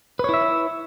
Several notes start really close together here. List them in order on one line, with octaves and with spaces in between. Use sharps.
B4 C#5 E4 E5